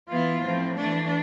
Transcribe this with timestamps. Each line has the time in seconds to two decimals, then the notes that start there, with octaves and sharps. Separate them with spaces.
0.10 E3 B3 E4 F4
0.44 A2 F3 C4
0.78 E3 A3 D4